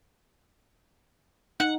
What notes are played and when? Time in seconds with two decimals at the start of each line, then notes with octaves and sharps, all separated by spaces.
1.60 D#4 F#5